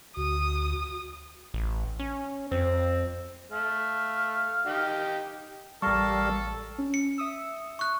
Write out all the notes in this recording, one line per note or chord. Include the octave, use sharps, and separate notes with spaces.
D2 F#4 D#6
A1
C#4
F2 C4
A3 F5
D#4 G4
A1 G3 A4 A#4 F5 A5 C#6
C#4
C#7
E5 D#6 E6
C#6 F#6